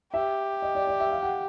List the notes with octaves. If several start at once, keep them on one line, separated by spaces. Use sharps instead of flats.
G4 E5
D#5
D5
D5
E5
F5
F#5